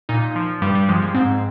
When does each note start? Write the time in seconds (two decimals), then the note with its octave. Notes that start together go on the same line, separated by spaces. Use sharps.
0.09 A#2 D#4
0.36 F3
0.62 G2 G3
0.75 G3
0.89 F3 G#3
1.02 A#3
1.14 G#2 C4